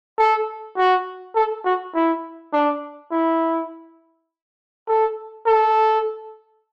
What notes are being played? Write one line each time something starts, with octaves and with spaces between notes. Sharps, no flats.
A4
F#4
A4
F#4
E4
D4
E4
A4
A4